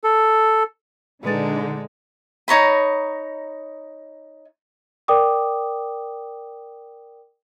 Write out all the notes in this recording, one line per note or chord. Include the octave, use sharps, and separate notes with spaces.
A4
A#2 D3 G#3 D#4 B4 A6
D#4 C#5 A#5 B5
A#4 D5 G5 D6 D#6